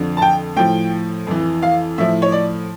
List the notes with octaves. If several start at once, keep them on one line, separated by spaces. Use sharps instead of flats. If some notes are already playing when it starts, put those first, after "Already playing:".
Already playing: F2 D3 F3
A5
G5
A2 F3 G5
F2 E3
F5
A2 F3 E5
C#5
D5